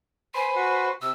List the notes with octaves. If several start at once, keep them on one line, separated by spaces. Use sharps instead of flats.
B4 C5 G#5
F#4
C3 E6